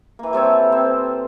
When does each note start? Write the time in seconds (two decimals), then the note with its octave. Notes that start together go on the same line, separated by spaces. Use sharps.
0.19 E3 A#3
0.33 G3 C4 A4 C#5
0.72 C4